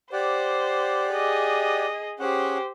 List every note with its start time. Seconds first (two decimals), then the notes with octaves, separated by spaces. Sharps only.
0.13 G4 C5 D5 F#5
1.12 G#4 D#5
2.20 C#4 G4 G#4 C5 F#5